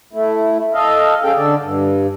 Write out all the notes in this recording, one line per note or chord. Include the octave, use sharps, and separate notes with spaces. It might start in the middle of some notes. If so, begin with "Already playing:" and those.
A3 E4
A4 D#5 F5
C#4 G#4 A4 F5 G5
D3 A4 D5
G2